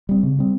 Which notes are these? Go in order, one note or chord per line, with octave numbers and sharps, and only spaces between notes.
G3 C4
C#3
G3 C4